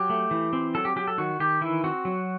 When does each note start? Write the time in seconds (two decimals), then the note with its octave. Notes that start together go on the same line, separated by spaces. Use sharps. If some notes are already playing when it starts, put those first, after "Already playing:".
Already playing: F#3 G4
0.10 A3
0.31 E3
0.53 C4
0.75 F#3 A4
0.85 G4
0.96 F#3 G4
1.07 A4
1.18 D#3 F#4
1.40 D#3 G4
1.61 E3 E4
1.84 C4 F#4
2.05 F#3